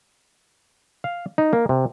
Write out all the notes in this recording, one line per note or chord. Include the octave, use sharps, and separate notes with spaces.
F5
D#4
A#3
C3